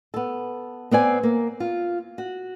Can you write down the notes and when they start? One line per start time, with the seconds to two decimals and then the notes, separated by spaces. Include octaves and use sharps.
0.14 B3 A4
0.91 B3 C4 D5 G#5
1.23 A#3
1.60 F4
2.18 F#4